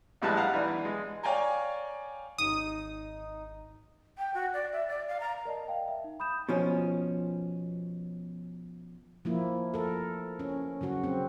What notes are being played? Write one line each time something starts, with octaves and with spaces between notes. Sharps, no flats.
A#1 A2 G3 G#3 B4 A5
F5 F#5 A5 A#5
B1 E3 D4
G#3
C#5 D5 F5 G5 G#5 A#5
G#1 D#4 D#6
G5
F#4
D5
E5
D5
F5
A#5
A#4 D5 D#5 A5
F5 G5
E5
D#4
B5 D#6 G6 E7
B2 F3 C#4
F3 A#3 E4
A4 A#4
C#4
C#3 F#3 F#4
C4